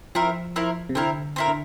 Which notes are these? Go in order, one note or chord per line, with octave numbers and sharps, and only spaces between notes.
F3 C4 E4 A#4
C4 E4 A#4
C3
D3 C4 E4 A#4
C4 E4 A#4
D3